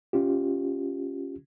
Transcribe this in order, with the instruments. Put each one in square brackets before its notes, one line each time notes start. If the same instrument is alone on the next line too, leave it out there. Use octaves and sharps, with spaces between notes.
[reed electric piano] C#4 F4 G4